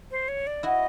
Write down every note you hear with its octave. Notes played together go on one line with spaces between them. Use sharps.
C5
C#5
D5
E4 F#4 D#5